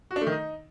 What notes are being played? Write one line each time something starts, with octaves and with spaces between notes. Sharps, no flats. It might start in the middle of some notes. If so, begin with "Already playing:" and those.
F#4
D4
A3
D#3
D#4